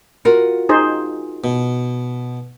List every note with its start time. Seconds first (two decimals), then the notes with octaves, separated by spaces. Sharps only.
0.25 F4 F#4 A#4
0.69 D#4 G#4 C5
1.44 B2